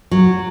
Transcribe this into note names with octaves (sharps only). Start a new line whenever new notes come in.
F#3